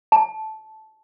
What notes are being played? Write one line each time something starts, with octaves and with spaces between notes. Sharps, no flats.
A5